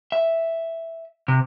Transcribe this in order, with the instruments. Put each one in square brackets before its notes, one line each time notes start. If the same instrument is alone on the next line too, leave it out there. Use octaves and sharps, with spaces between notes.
[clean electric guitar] E5
C3